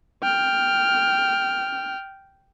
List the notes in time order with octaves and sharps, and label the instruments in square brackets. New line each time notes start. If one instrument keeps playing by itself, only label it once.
[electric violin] G5 F6